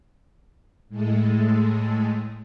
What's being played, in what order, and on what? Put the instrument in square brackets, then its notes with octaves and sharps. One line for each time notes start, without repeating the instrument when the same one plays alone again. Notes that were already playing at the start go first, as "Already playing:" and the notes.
[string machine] A2 G#3 A3